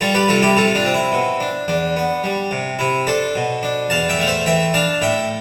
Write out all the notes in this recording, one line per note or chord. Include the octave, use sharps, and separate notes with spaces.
G3 F4 A4
G4 B4
C3 F4 A4
E4 G4
C3 F4 A4
D4 F4
C4
E4
B2
D4
E2 D4
B3
G3
C3
C3 E4
D4 A4 C5
B2
D4
E2 F5 A5
E5 G5
A3 F5
C5 E5
E3 E5 G5
D4 F5 A5
A2 E5 G5